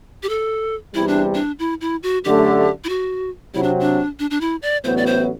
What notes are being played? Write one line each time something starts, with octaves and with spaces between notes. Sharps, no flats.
G4
A4
E2 C3 E3 G3 E4
D4
D4
E4
E4
F#4
F#2 D3 A3 G4
E4
F#4
C3 F#3 C4 E4
D4
D4
D4
D4
E4
D5
A1 A2 F#3 B3 C5
D5
C5